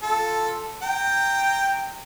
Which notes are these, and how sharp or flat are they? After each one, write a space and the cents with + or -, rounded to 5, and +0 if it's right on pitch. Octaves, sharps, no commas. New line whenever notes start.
F4 +0 A4 +0
G5 +5 A#5 -20